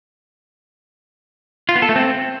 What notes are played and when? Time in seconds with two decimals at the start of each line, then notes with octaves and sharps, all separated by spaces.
1.69 F4
1.75 B3
1.82 A4
1.89 A3
1.96 C4